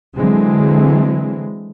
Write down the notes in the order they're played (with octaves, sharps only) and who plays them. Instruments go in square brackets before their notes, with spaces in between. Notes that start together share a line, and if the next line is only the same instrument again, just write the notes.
[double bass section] D3 E3 F#3 G#3 C4